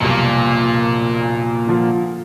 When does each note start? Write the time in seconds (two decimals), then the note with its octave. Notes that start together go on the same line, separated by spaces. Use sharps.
0.01 F1 B1 A#2 G3 A#3
1.67 D3 F3 F4